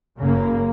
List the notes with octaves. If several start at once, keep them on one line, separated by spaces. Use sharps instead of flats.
F#1 F#2 C#3 A#3